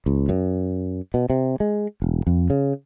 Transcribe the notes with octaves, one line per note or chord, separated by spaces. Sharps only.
C#2
F#2
B2
C3
G#3
E1
F2
C#3